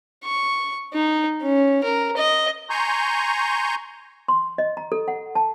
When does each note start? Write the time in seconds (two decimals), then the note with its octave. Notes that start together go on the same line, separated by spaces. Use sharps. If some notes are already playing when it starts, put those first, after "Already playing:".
0.25 C#6
0.93 D#4
1.42 C#4
1.83 A#4
2.17 D#5
2.70 G#5 A#5 C6 C#6 G6
4.28 C6
4.58 D#5
4.77 A#5
4.92 A4
5.08 F#5
5.35 A5